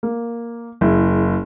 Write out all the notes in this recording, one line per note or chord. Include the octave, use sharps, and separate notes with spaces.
A#3
F#1 E4